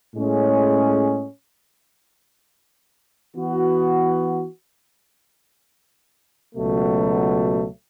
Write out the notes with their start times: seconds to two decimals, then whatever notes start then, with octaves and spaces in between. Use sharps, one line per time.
0.15 A2 G#3 C#4 G#4
3.35 E3 B3 F#4
6.55 C#2 B2 F#3 A3